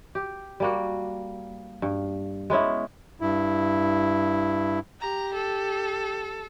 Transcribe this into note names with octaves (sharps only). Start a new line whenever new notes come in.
G4
G3 A#3 F#4
G2
G#3 B3 C#4 E4
G2 E4
G4 A#5
A4